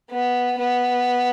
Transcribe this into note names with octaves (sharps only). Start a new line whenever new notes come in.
B3
B3